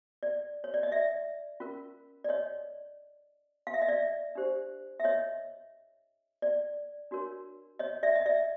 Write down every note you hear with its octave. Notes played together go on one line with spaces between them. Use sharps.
D5
C#5
D5
D#5
D5 E5
C#4 F4 A#4
D5
C#5 D#5
F5
E5
D#5
D5 E5
D4 G4 C5
E5
C#5 D#5
D5
D4 F#4 A#4 C#5
C#5 D#5
D5 E5
D#5
D5 E5